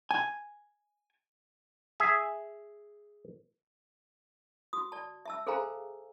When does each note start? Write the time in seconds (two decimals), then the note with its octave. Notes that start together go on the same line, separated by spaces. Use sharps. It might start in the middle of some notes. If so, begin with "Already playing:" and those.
0.11 G#5
2.00 G#4 E5
4.73 F#4 D#6
4.92 D5 A5
5.26 E5 A5 E6
5.47 G#4 A4 C5 F5 G#5 A#5